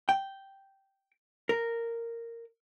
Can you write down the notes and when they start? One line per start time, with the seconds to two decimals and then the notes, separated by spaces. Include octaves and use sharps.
0.09 G5
1.49 A#4